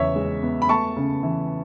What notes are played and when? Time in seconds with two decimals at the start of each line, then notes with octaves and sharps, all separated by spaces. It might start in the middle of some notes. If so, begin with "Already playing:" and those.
Already playing: E2 C#3 B3 C#5 E5
0.16 G#3
0.43 B3
0.62 B5
0.69 A3 A5 C#6
0.96 C#3
1.23 E3